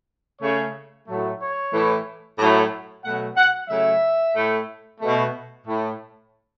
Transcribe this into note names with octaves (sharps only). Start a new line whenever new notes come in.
C#3 A3 C#5
A2 F#3 A3
C#5
A2 E3 A3
A2 F#3 A3
B2 F#3 A3 F#5
F#5
C#3 F#3 A3 E5
A2 A3
B2 A3
A2 A3